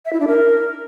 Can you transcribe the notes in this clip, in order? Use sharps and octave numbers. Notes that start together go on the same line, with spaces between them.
E5
E4
D4
A#4